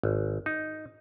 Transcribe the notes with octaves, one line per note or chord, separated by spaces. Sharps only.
G#1
D#4